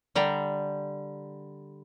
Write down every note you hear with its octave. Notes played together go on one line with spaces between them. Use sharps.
D3 G3 A#5